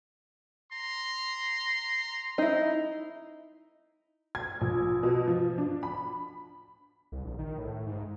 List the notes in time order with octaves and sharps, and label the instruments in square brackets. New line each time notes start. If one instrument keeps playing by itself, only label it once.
[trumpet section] A#5 C6
[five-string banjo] D#4 E4
[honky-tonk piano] G#6
A#1
B2
F3
D4
B5
[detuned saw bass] C2
A#1
D#3
A2
G#2